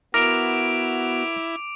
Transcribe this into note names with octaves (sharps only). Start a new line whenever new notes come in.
B3 E4 F#4 A#4 D6 D7 F7